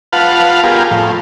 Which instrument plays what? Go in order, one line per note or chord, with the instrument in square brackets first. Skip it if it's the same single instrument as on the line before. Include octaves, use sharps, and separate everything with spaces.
[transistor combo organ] F4 B4 F5 F#5 A5
B3 F4 G4 G#4 A#4
A2 F3